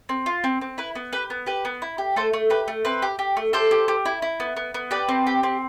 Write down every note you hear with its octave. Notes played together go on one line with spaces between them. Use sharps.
C4
F4
C4
C4
E4 B4
B3
G4 B4
B3
G4 B4
B3
E4
G4
A3 A4 C5
A3
G4 B4
A3
C4 B4
G4
G4
A3
G4 A4 C5
G4
G4
E4
E4
B3
B3
B3
G4 B4 D5
C4
G4
C4